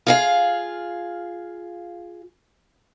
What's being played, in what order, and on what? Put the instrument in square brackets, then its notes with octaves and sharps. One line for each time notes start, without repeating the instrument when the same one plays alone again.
[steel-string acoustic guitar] F4 G#4 F5